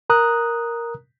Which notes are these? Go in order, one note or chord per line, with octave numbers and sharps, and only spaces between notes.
A#4 A#5 D#6 F#6